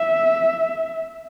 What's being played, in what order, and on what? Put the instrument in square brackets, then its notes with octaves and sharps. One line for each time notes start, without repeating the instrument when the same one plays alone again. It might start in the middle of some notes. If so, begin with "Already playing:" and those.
Already playing: [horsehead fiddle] E5